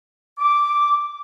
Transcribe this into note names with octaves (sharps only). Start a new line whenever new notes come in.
D6